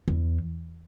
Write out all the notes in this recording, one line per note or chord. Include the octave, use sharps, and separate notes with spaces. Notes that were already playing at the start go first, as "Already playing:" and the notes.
E2